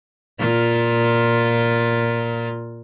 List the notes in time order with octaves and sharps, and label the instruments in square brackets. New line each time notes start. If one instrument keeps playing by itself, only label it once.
[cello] A#2 F4